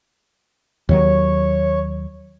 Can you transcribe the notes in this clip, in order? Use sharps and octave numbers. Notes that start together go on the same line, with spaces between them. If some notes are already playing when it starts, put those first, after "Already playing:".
D#2 D#3 F#3 C#5